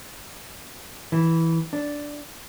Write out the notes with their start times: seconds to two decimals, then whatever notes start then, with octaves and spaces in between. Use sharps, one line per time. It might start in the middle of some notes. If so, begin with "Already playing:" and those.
1.12 E3
1.73 D4